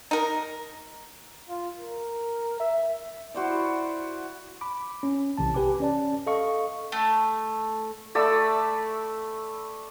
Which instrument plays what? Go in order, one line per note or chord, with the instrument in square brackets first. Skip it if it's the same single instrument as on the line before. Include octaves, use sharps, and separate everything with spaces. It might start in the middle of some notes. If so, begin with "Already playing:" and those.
[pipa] D#4 A#4
[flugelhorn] F4
A#4
E5
[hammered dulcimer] E4 F#4 C5 D5
[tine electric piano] B5 D6
C#4
B1 C3 E3 A5
G4 B4 G#5 D6
C#4 D5 A5
A4 D#5 F5 C#6
[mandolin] A3
[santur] A3 D5 B5 E6